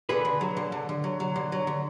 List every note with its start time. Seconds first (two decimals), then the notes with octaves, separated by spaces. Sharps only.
0.09 D3 G#4 B4
0.25 D3
0.41 F#3
0.57 D3
0.72 D3
0.89 D3
1.04 F#3
1.20 F#3
1.36 D3
1.52 F#3
1.67 D3